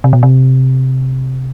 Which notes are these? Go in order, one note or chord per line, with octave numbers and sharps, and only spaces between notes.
C3
B2
C3